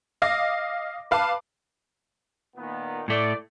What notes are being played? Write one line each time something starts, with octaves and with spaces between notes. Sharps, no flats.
D#5 F5 D6 A#6
B4 F5 A5 D6
A#2 D#3 B3
A2 A3 D5